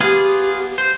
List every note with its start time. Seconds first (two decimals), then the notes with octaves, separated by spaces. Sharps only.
0.01 B3 F4 G4 G#4
0.78 C5